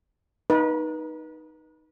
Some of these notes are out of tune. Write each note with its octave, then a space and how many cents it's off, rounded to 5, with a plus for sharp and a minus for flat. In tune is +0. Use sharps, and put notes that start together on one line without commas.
D#4 +0 B4 -30